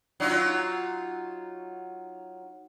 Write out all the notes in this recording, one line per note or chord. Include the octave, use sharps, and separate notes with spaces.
F#3 D#4 F4